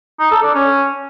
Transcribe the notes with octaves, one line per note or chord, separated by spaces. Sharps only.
D#4
A4
D4
C#4